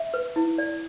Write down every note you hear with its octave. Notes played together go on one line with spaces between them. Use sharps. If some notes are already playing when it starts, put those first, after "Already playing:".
Already playing: E5
B4
E4
D5